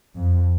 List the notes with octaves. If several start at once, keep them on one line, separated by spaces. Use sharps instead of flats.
F2